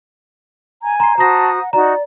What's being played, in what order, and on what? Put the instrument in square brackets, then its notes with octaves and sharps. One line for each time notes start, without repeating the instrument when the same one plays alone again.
[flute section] G#5 G#6 [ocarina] A#5
[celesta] A#5 C7 [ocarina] C6
[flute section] F#4 C5 D#6 [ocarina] A5 [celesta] A#5 A#6
[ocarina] F#5
[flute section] D#4 F#4 [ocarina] D5 [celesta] A#5